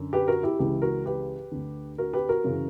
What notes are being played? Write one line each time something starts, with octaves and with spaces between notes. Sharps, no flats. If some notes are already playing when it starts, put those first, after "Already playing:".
Already playing: F#2 D3
G4 B4
F#4 A#4
E4 G4
C#2 C#3 E3 E4 G4
F#4 A#4
G4 B4
D2 D3
F#4 A#4
G4 B4
F#4 A#4
F#2 C#3 E3